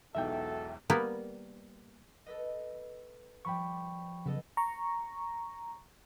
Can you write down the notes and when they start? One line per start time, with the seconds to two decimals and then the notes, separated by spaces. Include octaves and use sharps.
0.15 E1 B1 E2 D#4 F#4 A4 E5 G5
0.90 G3 A#3 B3 A#4 B4
2.26 A4 B4 D#5
3.45 F3 G3 G5 B5 C#6
4.26 C#3 F#3 B3 A4 D#5
4.57 A#5 C#6